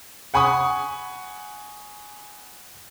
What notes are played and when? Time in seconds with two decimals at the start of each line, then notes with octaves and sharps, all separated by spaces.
0.34 F#5 G#5 B5 C#6 D#6